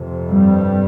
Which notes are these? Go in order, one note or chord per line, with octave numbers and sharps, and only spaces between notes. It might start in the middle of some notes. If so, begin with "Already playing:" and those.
Already playing: F2 C3
G2 G3